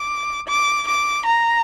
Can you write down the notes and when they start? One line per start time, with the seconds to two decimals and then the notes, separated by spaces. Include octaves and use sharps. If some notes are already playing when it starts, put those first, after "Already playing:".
Already playing: D6
0.48 D6
0.88 D6
1.26 A#5